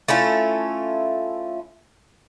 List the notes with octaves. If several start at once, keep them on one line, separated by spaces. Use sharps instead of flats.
A3 C#4 E4 F4